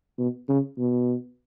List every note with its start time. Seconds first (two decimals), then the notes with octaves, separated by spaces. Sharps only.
0.18 B2
0.49 C#3
0.78 B2